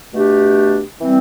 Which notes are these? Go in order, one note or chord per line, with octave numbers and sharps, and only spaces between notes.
B2 A3 D4 G4
E3 G3 C4